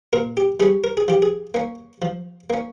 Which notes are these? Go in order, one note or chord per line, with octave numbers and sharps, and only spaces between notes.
A#2 A#4
G4
G3 C#4 G#4
A#4
G#4
F3 G4
G#4
A#3 C#4
F3
A#3 C#4